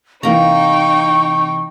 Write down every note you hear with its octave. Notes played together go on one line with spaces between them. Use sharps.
C3 E3 A#3 D#4 G5 A#5 C#6